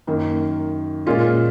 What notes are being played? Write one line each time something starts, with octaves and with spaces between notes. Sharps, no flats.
F#2 D#3 A#3
A#2 G#3 C#4 F4